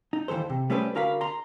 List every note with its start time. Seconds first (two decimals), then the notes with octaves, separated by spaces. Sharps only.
0.13 D#4
0.28 D#2 C#3 E3 A4 C5
0.50 C3
0.70 G3 A3 C#4 G#4 B4 C5
0.95 D3 F#4 A#4 F5 G#5 B5
1.21 A#5 C6